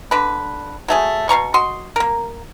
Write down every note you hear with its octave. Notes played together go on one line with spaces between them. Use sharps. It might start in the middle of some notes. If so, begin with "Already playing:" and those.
D3 B4
F#3 A3 G#4
B2 F5 A#5 C#6
F#4 D#5 C6
A#3 A#4